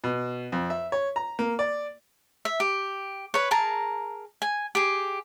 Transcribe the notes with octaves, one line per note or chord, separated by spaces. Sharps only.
B2
F2
E5
C#5
A#5
A#3
D5
E5
G4
B4 C#5
G#4 A#4 A5 A#5
G#5
G4 G#4